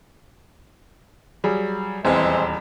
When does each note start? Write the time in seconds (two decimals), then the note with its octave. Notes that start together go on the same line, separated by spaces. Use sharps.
1.44 F#3 G3 G#4
2.05 D#1 E2 E3 G#3 C4